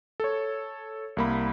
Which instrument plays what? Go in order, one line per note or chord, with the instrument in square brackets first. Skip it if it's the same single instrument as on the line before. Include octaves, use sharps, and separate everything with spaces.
[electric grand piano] A4 C#5
C2 A#3 B5